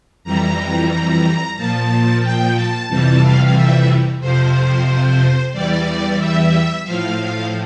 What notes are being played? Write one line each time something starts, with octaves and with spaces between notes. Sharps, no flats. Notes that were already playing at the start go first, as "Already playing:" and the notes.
F2 E3 G3 A#5
A#5
A#2 F3 A5
G5
A5
F2 C3 E3 G3 A5
F5
E5
F2 C3 F3 C5
E2 E3 G3 D5
E5
A2 F3 F5